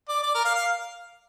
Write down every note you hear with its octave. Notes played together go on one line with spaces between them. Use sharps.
D5
D5
A#4
F5
F5